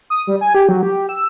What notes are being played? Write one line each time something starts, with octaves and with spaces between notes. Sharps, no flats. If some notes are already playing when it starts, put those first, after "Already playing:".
D#6
G3
G#5
G4
F#3
G4
E6